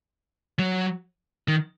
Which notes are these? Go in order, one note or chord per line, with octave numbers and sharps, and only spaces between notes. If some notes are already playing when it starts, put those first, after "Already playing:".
F#3
D#3